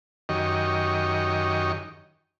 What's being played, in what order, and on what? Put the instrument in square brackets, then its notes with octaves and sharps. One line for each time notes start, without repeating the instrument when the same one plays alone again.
[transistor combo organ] F#2 D#3 G4 D#5 C#6